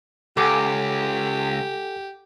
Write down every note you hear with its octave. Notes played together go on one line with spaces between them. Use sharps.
C#2 G4 A4 F#5 G#5 D6